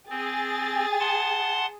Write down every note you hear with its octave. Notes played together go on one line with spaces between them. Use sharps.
C4 G#4 A6
F#5 A5 C6